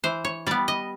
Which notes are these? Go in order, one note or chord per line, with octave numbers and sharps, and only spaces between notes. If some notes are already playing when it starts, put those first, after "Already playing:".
E3 C5
C#5
G3 B3 D5
D#5